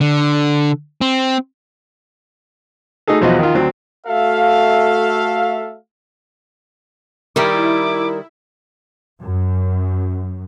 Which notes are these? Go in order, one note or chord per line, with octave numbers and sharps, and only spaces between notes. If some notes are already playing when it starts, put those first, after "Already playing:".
D3
C4
A3 D#4 F#4 G#4 A4
B1 E2 F3 F#4 D#5
D#3 F4
D2 F#3 C4
A3 F#4 A4 E5 F5
D#3 G3 E4 A#4 D6
F#2